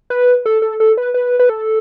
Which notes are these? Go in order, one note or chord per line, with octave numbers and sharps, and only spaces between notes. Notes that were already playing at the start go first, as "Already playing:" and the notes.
B4
A4
A4
A4
B4
B4
B4
A4